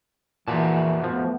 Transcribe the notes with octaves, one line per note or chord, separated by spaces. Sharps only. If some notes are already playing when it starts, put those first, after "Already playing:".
F2 A#2 E3 F#4 A5
F3 A3 B3